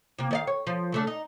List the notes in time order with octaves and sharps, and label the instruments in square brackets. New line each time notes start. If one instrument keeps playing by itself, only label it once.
[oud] C3 A#3
D#3 D5 F5
C#5
F3
C#3 A3 D4
D#4